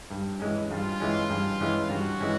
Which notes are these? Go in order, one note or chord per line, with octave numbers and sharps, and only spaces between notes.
G2
E3 G#3 C#4
G2 F4
E3 G#3 C#4
G2
E3 G#3 C#4
G2 F#4
E3 G#3 C#4